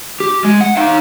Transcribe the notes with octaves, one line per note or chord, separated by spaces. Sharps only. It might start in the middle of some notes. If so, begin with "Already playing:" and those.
G4
G#3
F#5
D#4 F5